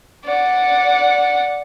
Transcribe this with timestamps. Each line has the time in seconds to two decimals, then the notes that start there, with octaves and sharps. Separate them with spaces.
0.24 D5 F#5